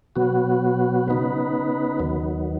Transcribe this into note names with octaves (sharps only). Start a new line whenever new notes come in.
B2 F#3 B3 F#4
C#3 B3 D#4 B4
D#2 D#3 F#3